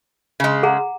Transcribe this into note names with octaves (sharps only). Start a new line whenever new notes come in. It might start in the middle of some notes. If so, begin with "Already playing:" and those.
C#3 G#3
G#4 F#5 A#5